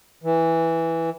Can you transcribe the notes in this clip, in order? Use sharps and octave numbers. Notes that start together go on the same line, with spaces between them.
E3